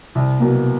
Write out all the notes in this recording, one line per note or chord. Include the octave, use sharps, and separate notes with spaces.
C2
B2 F#3 A#3